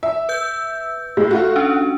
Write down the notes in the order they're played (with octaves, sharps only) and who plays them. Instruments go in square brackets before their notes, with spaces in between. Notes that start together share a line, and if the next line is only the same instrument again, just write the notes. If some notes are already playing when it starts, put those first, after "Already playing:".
[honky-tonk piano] E5
[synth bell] B4 E6 G6
[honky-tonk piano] A2 G#3
A3 F4 F#4
[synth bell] C#4 D4